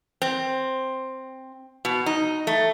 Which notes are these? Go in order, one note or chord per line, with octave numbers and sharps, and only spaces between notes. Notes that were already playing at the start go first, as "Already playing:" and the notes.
C4
B2
D#4
A3